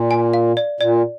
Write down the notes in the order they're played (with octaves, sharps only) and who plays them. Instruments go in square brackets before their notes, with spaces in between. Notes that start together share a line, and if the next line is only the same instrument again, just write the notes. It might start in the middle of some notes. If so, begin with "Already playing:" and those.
Already playing: [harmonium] A#2 [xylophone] D5
[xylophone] G#5
F5
D5
[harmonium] A#2 [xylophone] D5